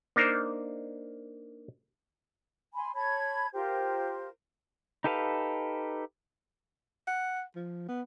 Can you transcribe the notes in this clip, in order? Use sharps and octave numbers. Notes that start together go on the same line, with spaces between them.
A#3 D4 D#4 A#4 C5
G#5 B5 C6
C#5 A5 B5 G#6
F4 G4 A#4 C5
D#4 G4 A4 B4 F5
F#5
F3
B3